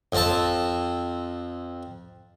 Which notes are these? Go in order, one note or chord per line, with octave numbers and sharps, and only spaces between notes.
F2 C4 A5